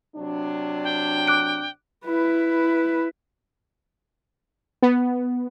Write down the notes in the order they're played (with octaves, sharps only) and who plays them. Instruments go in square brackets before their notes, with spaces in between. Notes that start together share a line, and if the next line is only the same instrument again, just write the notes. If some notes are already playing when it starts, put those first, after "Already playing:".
[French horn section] C3 F#3 D4
[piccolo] G5
[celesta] D6 F#6 D7
[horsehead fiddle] E4 B4
[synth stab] B3